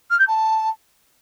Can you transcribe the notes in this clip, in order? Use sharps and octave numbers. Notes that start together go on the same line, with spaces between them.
F6
G6
A5